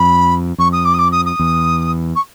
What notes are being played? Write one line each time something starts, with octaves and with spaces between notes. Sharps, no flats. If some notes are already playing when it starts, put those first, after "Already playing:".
Already playing: F2 B5
F2 C#6
D#6
D6
D#6
D6
D#6
D#6
E2
C#6